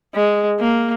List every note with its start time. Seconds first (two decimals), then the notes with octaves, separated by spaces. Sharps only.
0.15 G#3
0.60 A#3